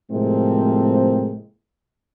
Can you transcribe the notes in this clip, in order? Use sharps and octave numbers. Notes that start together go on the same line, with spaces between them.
A2 C3 F3 G#3 A#3 C4